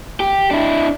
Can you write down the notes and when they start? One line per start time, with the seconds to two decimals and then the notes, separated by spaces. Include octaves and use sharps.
0.20 G4
0.51 D4 E4